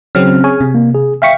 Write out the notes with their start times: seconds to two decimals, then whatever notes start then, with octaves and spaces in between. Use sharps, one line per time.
0.15 C#3 F#3 C4 F6
0.44 G#4 C#5 G#5
0.60 C3
0.75 A#3
0.95 G#4
1.22 E5 F5 G5 C#6 B6 C#7